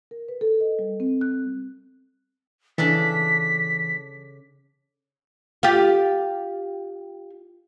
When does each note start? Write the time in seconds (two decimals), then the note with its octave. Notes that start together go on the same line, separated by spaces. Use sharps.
0.11 A#4
0.29 B4
0.41 A4
0.61 D#5
0.79 G3
1.00 C4
1.21 F#6
2.78 C#3 E3 D4 A4 B6
5.63 F4 G4